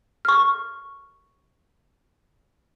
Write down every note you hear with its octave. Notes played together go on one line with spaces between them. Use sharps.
C#6 F6